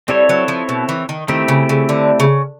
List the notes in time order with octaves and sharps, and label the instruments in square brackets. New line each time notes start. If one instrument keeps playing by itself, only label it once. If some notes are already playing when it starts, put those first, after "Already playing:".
[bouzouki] G3 [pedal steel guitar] C4 E4 A4 C#5
[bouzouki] F#3
F3
B2
E3
D#3
[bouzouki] D#3 [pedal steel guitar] A3 C4 E4 G4
[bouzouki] C#3
C#3
D3
C#3